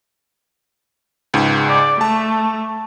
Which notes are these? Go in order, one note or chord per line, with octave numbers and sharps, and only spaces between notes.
C#2 G#2
D5
A3 A5